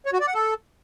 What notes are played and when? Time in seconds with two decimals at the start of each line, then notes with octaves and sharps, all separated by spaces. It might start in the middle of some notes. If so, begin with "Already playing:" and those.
0.06 C#5
0.13 F#4
0.20 D5
0.27 F#5
0.34 A4